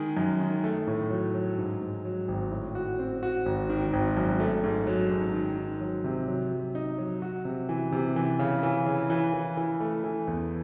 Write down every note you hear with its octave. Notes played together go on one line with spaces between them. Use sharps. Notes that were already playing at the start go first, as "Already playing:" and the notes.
Already playing: D#3 G#3
F#2
D#3
A3
A2
F#3
F#3
G#2
G#2
F#3
G#1
A2
F#4
C4
F#4
G#1
D#3
G#1
F#2
A3
G#2
F#3
G#2
D#3
D#3
F#3
C3
F#3
F#3
D#4
F#3
F#4
C3
E3
C3
E3
C#3
E3
C#3
E3
E3
E3
A3
E3
E2